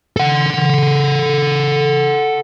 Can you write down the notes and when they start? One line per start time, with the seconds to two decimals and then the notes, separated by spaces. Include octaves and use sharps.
0.17 A4 F#5